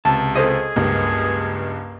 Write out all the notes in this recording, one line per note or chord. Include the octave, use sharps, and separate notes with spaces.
C#2 C3 A5
G#4 A4 C5 D#5
C#2 G2 A#3